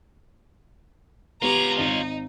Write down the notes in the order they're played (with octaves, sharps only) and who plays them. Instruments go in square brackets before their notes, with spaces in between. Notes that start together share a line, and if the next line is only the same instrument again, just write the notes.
[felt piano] B3 G4 [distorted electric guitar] F4 C#5 [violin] A#5
[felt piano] G#1 [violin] D#4